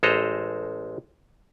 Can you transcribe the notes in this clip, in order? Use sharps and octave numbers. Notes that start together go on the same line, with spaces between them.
A1 G#3 A4 C5 D#5 A#5